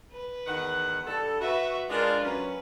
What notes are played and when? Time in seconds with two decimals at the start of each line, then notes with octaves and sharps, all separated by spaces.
0.13 B4
0.47 E2 D#3 F#5
1.07 G2 A4
1.41 F#4 B4 E5
1.89 G#3 D4 F4 A#4
2.23 F#3 C#4 B4